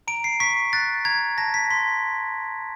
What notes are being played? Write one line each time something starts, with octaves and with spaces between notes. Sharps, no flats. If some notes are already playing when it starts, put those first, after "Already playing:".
A#5 D7
C7
C#6 B6
F#6 A6
A#5 G#6
A5 A#6
B6
C6 B6